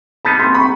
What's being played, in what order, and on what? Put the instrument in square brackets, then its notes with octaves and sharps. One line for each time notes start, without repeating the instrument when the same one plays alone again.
[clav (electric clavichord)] G3 B3 D#4 [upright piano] A5 B5
[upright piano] A#5 C6
B5 C#6